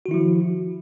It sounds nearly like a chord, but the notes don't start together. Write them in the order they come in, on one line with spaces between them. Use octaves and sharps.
F#4 D#3 E4 F3